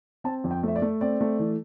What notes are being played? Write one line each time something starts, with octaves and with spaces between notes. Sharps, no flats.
C4 A5
F2
G5
A3 E5
D5
A3
C4 D5
A3
E3